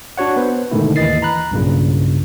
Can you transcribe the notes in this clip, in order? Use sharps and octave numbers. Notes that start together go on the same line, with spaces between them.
D4 F#4 C#5 F#5
B3 B4 C5
G#2 B2 D3 D#3 A3 E4
D#2 E3 D#5 A6 C7
A#5 B5 F#6
B1 G2 A#2 C#3